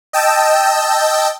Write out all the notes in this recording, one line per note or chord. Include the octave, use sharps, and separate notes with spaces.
D#5 G5 A5 E6